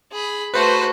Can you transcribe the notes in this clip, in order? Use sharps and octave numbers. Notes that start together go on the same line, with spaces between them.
G#4 B5
A3 F#4 B4 C5